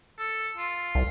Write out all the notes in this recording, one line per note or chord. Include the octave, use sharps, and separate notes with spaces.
A4
F4
C2